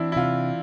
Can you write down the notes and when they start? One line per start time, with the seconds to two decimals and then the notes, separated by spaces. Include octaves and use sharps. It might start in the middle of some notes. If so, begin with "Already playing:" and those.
Already playing: E3 C4 D4 E4
0.12 E4
0.16 C3 F4